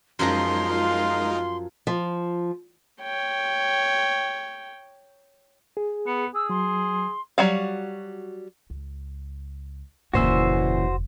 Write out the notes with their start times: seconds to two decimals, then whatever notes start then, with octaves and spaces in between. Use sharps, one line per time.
0.19 F#2 F3 G#3 D#4 A#4 A#5 C6
0.67 F4
1.87 F3
3.02 C#5 G5
5.77 G#4
6.07 B3 C#7
6.34 G#4 E6
6.50 F#3 C6
7.38 F#3 G3 F#4 F5
8.70 C#2
10.14 F1 D2 A#2 C#3 E3 F#4 C5 E6